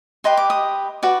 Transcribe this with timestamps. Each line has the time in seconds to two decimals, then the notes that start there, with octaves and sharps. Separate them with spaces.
0.24 G4 B4 D#5 C6
0.37 D6
0.50 D#6
1.03 F#4 B4 D5